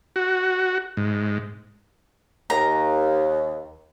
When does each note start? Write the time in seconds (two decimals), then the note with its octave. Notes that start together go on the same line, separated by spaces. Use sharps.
0.16 F#4
0.97 G#2
2.50 D#2 A#5